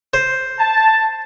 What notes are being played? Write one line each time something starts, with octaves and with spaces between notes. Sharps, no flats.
C5
A5